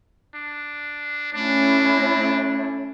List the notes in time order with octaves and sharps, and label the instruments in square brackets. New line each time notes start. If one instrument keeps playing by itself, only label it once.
[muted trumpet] D4
[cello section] A3 C#4 E4 [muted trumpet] D4